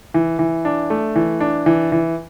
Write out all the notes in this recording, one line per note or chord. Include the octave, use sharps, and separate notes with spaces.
E3
E3
D4
A3
E3
D4
E3
E3